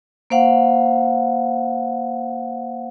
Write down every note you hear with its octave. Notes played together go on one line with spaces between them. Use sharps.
A#3 C5 F5 F#5